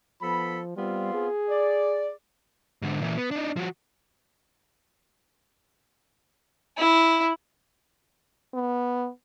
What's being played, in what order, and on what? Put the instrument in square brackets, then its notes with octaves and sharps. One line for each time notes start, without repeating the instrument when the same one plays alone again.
[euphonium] F3 [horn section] B3 A4 B5
[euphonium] G3 [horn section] B3 C4 F4
[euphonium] G#4
[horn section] D5
[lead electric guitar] G#2 D3
A#2 E3
B3
D4 D#4
F3 F#4
[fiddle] E4
[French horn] B3